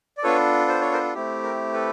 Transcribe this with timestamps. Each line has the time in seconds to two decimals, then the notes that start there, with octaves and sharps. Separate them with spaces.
0.18 D5
0.23 B3 D4 F4 A4 B4 C#5
0.68 C5
0.81 C#5
0.92 A#4 C5
1.14 A3 C4 E4 G4
1.43 A#4
1.73 A4 B4